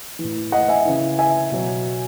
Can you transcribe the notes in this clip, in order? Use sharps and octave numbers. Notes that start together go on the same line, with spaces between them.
A2 E3
D#5 F#5
E5 G#5
C#3 E3
E5 G#5
B2 F#3